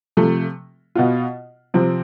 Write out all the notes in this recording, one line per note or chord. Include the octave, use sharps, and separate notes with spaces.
C3 F3 A3
B2 B3 F4
C3 F3 C4